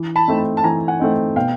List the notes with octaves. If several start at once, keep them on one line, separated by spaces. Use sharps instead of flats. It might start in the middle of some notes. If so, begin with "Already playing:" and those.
Already playing: E3
A5 B5
A3 C4 D#4
A5
E3 G#5 A#5
F#5 G#5
A3 C4 D#4
B2 F5 G5